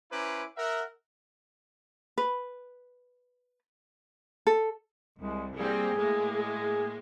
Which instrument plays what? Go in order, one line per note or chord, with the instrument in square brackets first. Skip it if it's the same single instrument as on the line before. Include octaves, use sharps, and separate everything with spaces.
[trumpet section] C#4 E4 B4 C5 A#5 D6
A#4 E5 F#5
[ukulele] B4
A4
[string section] C2 [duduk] G#3
[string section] G3 A#3 C4 [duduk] G#4
[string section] A2 G#3 A#3
[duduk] G#4